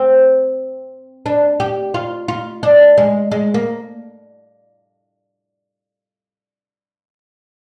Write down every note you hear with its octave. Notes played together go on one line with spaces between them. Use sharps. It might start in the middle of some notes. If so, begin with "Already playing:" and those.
Already playing: C4
D4
G4
F4
F4
D4
G#3
G#3
A#3